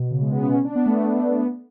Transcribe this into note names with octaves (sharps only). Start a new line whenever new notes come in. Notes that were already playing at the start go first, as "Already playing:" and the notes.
Already playing: B2
C#3
G#3
B3
C#4
C#4
D4
B3
A3
B3